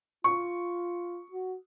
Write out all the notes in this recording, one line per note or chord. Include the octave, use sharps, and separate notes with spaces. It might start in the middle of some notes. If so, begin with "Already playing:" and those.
F4 C#6
F#4